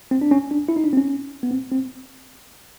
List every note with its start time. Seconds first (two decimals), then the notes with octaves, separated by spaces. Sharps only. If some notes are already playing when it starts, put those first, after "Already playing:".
0.11 C4
0.21 D4
0.31 C#4
0.51 D4
0.69 E4
0.76 D#4
0.84 D4
0.93 C4
0.97 C#4
1.43 B3
1.51 C4
1.72 C4